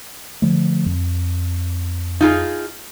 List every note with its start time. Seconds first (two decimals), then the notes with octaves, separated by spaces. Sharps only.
0.42 D3 F3 A3
0.86 F2
2.21 D#4 F4 G#4